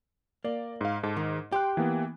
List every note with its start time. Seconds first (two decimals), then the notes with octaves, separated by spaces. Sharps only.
0.45 A#3 D5
0.81 G#2 F5
1.03 G#2 A4
1.17 D#3
1.52 G4 G5 C6 F#6
1.77 E3 A#3 B3